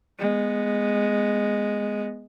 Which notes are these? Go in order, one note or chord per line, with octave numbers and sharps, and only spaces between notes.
G#3 B3